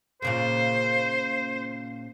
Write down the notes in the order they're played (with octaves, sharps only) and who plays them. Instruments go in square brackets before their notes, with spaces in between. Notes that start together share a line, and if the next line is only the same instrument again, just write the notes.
[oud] A#2 C#3 A#3 [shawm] C5